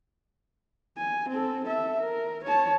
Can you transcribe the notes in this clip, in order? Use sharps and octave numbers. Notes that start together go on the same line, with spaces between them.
G#5
C4 A4
A4 E5
A#4
C#5 A5